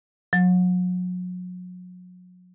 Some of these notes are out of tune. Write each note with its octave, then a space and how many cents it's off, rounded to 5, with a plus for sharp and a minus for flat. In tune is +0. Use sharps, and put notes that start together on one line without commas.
F#3 -35